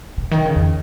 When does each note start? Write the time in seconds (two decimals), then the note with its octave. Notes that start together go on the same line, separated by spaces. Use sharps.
0.18 C3
0.31 D#3
0.46 C#3
0.56 F2